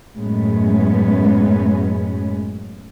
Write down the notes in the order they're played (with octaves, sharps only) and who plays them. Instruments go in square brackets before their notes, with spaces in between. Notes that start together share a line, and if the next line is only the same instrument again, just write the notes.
[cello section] F#2 A2 G#3 B3 C#4